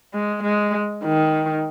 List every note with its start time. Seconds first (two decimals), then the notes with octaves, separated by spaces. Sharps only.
0.13 G#3
0.43 G#3
1.04 D#3